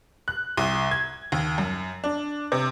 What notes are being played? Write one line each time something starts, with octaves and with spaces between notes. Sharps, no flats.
F#6
C2
G#6
D#2
F#2
D4
C3